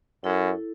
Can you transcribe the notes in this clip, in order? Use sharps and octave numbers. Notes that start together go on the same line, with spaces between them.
F#2 E4 A4